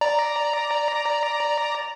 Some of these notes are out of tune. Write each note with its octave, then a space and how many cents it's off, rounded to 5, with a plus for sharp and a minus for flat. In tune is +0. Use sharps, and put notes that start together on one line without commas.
D5 +0 A#5 +0